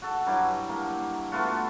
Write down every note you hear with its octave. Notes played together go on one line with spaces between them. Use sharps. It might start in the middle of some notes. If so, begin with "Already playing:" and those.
F#4 A4
G2 F#3 E4 D6
A#3
A3 B3 F4 F#4